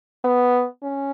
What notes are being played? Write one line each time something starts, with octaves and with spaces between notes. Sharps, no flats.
B3
C#4